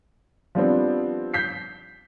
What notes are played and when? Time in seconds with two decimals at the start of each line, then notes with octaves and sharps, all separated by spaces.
0.55 F3 G3 B3 C4 D4
1.34 G6 B6 C7